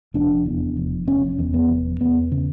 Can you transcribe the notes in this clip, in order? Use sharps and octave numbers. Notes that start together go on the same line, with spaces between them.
F1 D4
E2
F1
F1 C#4
E2
B3
F1
E2 B3
C#3